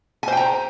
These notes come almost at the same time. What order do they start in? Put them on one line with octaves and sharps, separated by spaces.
G#5 C5 G5 A#5